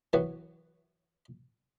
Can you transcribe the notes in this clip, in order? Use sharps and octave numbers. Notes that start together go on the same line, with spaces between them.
E3 F#3 B3 F#4